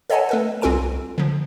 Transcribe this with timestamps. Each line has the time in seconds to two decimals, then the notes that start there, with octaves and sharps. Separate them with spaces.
0.10 A4 C#5 D#5 F#5 G#5 A5
0.29 A3 A4 B4
0.61 C2 C4 F4 A4 G#5 D7
1.18 D3 F3